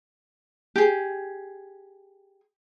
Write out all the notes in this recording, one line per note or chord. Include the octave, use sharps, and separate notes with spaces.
G4 G#4